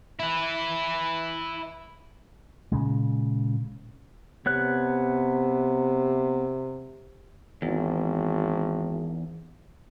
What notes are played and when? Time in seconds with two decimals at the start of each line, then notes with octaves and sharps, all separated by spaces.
0.19 E4 B4
2.72 A#2 C#3 G#3
4.46 C3 B3 C#5 F#6
7.62 G#1 E2